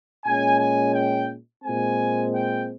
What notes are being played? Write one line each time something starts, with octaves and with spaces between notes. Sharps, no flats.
A#2 G#3 C#4 G#5
G#5
G5
A#2 G#3 C4 G#5
G5